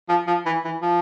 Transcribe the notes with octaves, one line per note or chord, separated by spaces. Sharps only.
F3
F3
E3
E3
F3